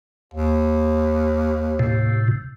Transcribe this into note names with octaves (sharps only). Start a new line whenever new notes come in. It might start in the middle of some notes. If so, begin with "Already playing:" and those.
D#2
A2 C3